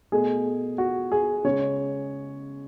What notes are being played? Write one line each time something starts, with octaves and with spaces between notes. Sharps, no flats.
B2 A3 G#4
F#4
G#4
C#3 G#3 C#5